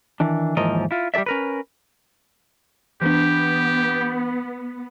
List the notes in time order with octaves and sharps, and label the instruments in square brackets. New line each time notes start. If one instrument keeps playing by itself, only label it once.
[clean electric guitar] D#3 E3 D4
D#2 G#2 E3 F3 A#4 D#5
E4 F4
G3 G4 A4 D5 E5
C#4 A#4 B4
[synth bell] E3 D4 [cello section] B3 [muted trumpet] G4